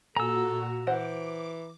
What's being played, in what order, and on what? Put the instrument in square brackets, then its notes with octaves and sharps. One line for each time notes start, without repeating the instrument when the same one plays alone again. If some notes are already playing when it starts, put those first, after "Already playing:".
[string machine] A#2 F#4 [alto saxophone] A4 [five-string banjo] G#5 [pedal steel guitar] A#5 E6
[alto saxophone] E3 [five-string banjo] C5 F#5 [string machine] D6